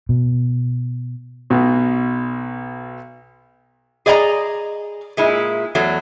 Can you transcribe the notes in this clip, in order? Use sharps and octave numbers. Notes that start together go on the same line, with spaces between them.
B2
B1 B2
G#4 D5 D#5 G#5 A#5
A#2 G#3 E4
E2 F#3 A3